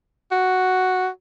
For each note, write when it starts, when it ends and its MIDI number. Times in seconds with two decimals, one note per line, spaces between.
0.32 1.08 66